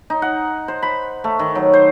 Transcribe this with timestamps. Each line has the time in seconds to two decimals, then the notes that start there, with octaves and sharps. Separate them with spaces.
0.10 D#4
0.22 F#5
0.68 C5
0.83 B5
1.24 A3
1.39 D#3
1.55 F#3
1.74 C5